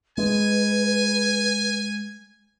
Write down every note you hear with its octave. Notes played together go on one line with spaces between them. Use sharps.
G#3 B4 G#5